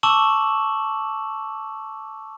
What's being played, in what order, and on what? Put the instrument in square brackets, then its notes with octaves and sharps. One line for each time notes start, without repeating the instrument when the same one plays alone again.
[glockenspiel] A5 C#6 D6 E6 E7 F#7